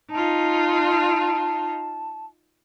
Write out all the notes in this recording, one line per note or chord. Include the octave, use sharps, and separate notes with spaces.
D#4 F4 A5